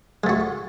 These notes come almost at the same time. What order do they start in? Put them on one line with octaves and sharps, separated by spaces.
G#3 A3 F#4